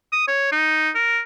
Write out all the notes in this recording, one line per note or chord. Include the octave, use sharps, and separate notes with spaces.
D#6
C#5
D#4
A#4